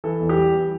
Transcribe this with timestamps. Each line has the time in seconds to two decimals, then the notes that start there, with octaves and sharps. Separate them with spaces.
0.04 E3 A4
0.20 E2
0.29 G4
0.37 G3
0.55 E3